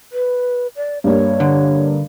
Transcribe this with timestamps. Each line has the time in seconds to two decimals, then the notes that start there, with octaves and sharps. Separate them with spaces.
0.12 B4
0.76 D5
1.04 G2 A#3 C#5
1.40 D3